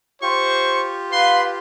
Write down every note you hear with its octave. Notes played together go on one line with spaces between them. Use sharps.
F4 G4 C5 C#6
B4 F5 C6